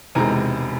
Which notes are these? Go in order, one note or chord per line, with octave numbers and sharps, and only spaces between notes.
E1 E2 C3 D#3 G#3 G#5 A#5